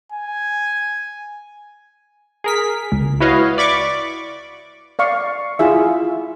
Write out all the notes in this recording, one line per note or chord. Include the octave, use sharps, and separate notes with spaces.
G#5
G#4 A#4 B6
C#2
E4 F#4 B4 C#5 D#5 F5
D5 B5 C#6 D6
D5 F5 C#6
E4 F4 G#4 E5